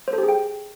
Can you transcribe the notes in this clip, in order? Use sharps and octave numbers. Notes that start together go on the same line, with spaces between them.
C5
A4
G4
G#4
G5